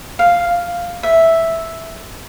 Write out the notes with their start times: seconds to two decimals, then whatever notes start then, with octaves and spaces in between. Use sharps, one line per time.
0.19 F5
1.03 E5